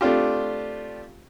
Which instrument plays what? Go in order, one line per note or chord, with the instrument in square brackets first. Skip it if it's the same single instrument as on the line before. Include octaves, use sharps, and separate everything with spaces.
[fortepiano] A3 C4 D4 F4 G4